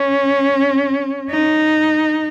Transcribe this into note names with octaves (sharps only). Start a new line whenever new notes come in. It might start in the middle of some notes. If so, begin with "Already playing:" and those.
Already playing: C#4
D#4